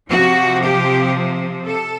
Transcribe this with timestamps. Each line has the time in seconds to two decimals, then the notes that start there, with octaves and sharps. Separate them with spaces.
0.10 C3 F3 F#4
0.63 G4
1.67 A4